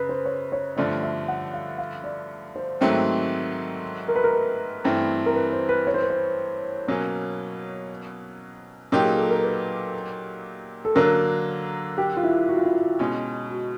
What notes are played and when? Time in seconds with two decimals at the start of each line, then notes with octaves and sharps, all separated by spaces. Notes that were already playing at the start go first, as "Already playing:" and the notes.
Already playing: F#2 C#3 B4
0.09 C5
0.25 C#5
0.52 C#5
0.77 G2 D3 F3 A3 D5
1.03 E5
1.28 F#5
1.54 F5
1.78 F5
2.04 D5
2.56 C5
2.81 G#2 D#3 F#3 A3 C4
4.08 A#4
4.16 B4
4.24 A#4
4.84 G2 E3 A3 C4
5.26 A#4
5.36 B4
5.52 C5
5.69 B4
5.87 C#5
5.94 C5
6.02 B4
6.10 C5
6.88 B2 F#3 A#3 C#4 C#5
8.92 A#2 F#3 A#3 D#4 G4
9.03 G#4
9.17 A4
9.30 A#4
9.43 B4
10.85 A4
10.95 D3 F#3 A#3 D4 A#4
11.98 G4
12.17 F4
12.23 E4
12.49 F#4
12.57 F4
12.65 E4
12.74 F4
12.99 B2 G#3 C#4
13.51 F#4